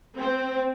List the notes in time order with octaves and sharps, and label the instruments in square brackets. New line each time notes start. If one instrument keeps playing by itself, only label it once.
[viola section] C4